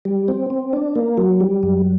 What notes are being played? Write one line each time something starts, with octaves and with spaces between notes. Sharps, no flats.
G3
C4
C4
D4
A#3
F#3
G3
F#2